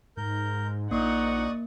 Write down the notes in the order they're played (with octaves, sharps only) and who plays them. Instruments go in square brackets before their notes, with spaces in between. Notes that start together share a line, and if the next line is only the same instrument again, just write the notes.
[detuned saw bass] G#2 [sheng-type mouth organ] A#4 G6
[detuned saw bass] A#1 [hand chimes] A#3 [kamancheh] D#4 F#5 [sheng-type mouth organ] D5 C#6 D#6